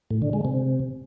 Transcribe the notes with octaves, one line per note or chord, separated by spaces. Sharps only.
A2
D3
G#3
C3